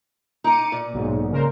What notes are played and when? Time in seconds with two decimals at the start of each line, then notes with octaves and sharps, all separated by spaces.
0.44 D#4 A#5 D6 C#7 D#7
0.72 A#2
0.94 B1 G#2
1.32 C#3 A#4 C5